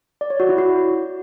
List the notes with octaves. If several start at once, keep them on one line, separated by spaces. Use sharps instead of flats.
D5
C#5
F#4
E4
F#4